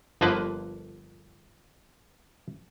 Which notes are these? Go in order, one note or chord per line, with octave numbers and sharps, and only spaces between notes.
G1 D3 F3 A#3 B4